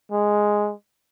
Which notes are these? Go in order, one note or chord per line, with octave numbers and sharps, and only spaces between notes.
G#3